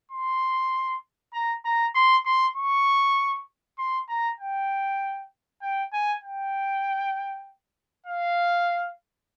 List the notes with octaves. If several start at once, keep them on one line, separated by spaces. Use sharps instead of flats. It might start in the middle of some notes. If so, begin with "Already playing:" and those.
C6
A#5
A#5
C6
C6
C#6
C6
A#5
G5
G5
G#5
G5
F5